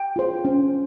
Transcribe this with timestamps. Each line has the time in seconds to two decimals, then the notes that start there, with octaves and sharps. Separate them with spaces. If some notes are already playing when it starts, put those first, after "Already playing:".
Already playing: G5
0.16 F4 G#4 C5
0.45 C#4